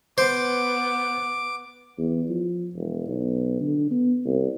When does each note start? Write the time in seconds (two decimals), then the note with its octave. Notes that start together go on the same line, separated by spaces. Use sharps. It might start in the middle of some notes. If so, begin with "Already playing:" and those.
0.18 B3 C5 D6
1.98 E2
2.29 F3
2.75 E1
3.08 B1
3.61 D3
3.91 B3
4.25 C2